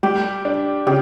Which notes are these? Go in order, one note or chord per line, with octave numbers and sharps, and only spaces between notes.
G3 G4
D4
C#3 G4